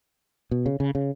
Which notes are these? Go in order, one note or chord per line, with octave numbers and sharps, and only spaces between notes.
B2
C#3
C#3
C#3